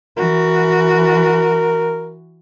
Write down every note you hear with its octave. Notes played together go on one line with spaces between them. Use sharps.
E3 F#4 A#4